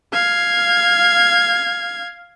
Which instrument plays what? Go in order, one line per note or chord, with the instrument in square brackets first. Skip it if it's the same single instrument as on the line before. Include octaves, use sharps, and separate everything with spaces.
[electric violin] F5 G#6